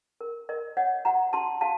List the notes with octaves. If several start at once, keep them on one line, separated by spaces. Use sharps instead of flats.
A#4
A#4 D#5
C#5 D#5 F#5
F#4 F#5 A#5
F#4 A5 C6
F#4 F5 A5